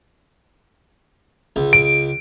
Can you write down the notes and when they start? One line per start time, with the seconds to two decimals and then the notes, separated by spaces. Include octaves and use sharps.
1.56 C#2
1.73 D7